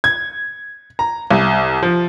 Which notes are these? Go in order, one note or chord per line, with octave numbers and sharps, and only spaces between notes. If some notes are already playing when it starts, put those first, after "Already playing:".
G#6
A#5
C2
F3